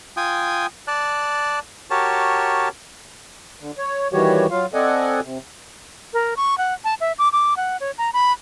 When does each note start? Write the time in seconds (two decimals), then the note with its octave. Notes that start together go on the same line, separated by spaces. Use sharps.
0.17 F4 G5 G#5 D#6
0.88 D5 A5 F#6
1.91 F#4 G4 A#4 C#5 A5
3.60 D3
3.78 C#5
4.13 D#3 E3 G3 F#4 G4 C#5
4.51 F#3 F4 F5
4.74 C4 A4 D5 D#5 F#5 G#5
5.24 C3
6.13 A#4
6.37 C#6
6.58 F#5
6.84 A5
7.01 E5
7.19 D6
7.33 D6
7.57 F#5
7.80 C#5
7.98 A#5
8.13 B5